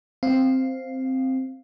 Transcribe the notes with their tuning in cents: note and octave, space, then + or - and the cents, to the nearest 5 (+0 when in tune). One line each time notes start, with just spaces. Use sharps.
C4 +0 F5 +0